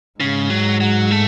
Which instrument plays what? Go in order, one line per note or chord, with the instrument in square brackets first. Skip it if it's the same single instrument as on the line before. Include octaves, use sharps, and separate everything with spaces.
[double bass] G#2 [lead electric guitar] C#3
[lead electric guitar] F#3
F#3
A3